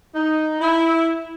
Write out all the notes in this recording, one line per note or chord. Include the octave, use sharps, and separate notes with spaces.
D#4
E4